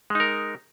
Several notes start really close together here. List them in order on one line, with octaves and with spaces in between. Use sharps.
G#3 D#4 A#4